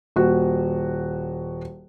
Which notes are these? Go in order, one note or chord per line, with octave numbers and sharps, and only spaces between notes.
D#1 F#4